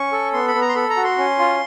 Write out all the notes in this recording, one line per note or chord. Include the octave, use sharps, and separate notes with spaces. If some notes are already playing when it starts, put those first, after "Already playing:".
Already playing: C#4 C#6
A4
B3 C6
B5
B3
A#5
C6
A4 B5
A#5
F#4
C6
C#4
F4